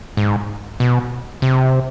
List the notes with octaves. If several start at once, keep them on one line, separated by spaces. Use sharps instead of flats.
G#2
B2
C3